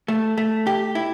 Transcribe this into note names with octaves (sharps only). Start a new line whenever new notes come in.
A3
A3
G4
E4